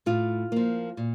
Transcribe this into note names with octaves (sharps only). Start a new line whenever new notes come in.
A2 F4
F3 A#3
A#2